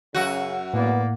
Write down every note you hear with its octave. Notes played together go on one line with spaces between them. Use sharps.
F#2 C#3 F#4
A2 A#3 B3 D5 F#5